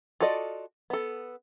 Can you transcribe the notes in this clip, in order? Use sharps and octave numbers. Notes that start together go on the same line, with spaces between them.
F4 F#4 A4 D5 D#5
B3 A4